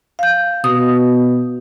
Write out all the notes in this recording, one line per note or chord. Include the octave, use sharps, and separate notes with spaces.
F5 G6
B2 D#6